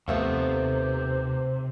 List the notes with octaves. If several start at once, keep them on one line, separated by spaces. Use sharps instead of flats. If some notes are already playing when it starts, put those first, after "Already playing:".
D#2 C3 F3 A3 B3 C5